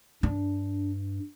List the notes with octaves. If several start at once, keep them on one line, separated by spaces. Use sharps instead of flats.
G2 D4